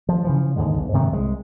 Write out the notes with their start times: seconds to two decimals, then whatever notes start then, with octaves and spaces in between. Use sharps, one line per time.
0.09 F3
0.24 C#3 E3 F3
0.56 D#2 G#2 D3 G#3
0.78 B1
0.93 G#2 C3 D#3 F#3
1.13 C2 G#3